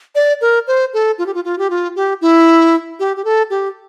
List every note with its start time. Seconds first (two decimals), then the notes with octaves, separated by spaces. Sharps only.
0.15 D5
0.41 A#4
0.67 C5
0.94 A4
1.18 F4
1.26 G4
1.34 F4
1.44 F4
1.59 G4
1.70 F4
1.96 G4
2.21 E4
2.99 G4
3.17 G4
3.25 A4
3.50 G4